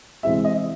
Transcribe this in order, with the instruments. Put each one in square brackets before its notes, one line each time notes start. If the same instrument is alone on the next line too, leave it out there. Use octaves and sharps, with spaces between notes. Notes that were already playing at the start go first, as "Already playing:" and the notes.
[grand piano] C3 E3 G#3 C4 E4 [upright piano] E5
[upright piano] D#5